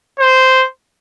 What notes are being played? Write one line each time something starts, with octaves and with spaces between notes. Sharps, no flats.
C5